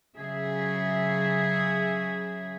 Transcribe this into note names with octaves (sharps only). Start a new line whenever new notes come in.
C#3 F#3 G#4 E5